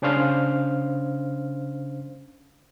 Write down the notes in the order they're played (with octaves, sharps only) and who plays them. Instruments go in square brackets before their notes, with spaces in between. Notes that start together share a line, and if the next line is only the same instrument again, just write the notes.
[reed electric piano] C#3 C#4 D4 C5 F5 F6